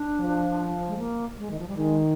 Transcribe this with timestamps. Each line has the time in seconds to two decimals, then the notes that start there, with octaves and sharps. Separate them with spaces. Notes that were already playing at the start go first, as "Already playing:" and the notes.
Already playing: D4
0.20 F3
0.88 G#3
0.98 A#3
1.38 G#3
1.51 D#3
1.59 F3
1.68 G3
1.77 D#3 G#3